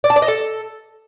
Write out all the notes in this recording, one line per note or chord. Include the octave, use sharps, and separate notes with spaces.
D5
A5
D5
D#5
A4